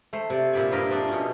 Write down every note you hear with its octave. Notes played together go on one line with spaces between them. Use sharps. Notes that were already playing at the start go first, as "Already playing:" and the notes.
A3 C5
C3 D5
A#2 E4 G4 D5 G#5
G2 F3 C4 G4 A#4 D#5
A3 C4 D4 D5 D#5
B2 C#4